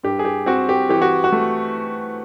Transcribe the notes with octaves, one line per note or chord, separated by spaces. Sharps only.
G2 G4
G#4
G4
C4 F#4
G4
E3 G4
F#4
F#4
A3